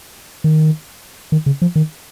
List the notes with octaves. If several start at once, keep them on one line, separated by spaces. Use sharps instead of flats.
D#3
D#3
C#3
F3
D#3